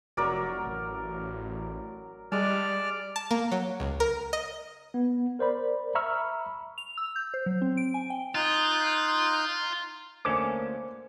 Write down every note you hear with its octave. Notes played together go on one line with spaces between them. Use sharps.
F1 F#3 A#4 D5
A1
G3 G#3 D5 A5 F6
A5
A#3
F#3
C#2
A#4
D#5
B3
A#4 C5 D5 B5
E5 A#5 B5 C#6 E6 F6
F7
E6
G6
C5
F#3
C4
D7
G#5
G5
D#4 F4 F#6 G6
D2 A#3 C#4 A4 C5 G#5 D6